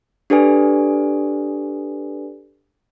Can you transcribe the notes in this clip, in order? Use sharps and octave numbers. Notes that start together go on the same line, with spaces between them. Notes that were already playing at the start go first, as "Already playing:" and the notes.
D4 G4 A4 B4 D5 G#5